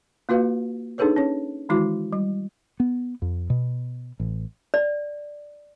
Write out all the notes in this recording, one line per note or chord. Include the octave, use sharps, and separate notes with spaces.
A#3 F4 F#4 B4 F5
D4 D#4 G#4 A4 B4 C#5
C#4 C#5
D#3 E3 G#3 E4 F#4 D6
G3
B3
F2
B2
A1
D5